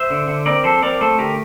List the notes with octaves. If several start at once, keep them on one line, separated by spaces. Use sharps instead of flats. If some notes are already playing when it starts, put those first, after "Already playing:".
Already playing: C5 E5
D3
D3
C4 A#4 D5
F3 A4 C5
C4 A#4 D5
A3 A4 C5
D3 G4 A#4